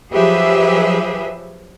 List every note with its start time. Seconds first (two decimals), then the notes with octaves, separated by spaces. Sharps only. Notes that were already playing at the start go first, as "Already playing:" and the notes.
0.11 F3 F#3 G4 G#4 B4 E5